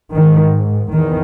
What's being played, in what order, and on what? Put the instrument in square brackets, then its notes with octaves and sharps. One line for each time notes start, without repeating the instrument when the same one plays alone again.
[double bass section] G#2 D#3
E2 D#3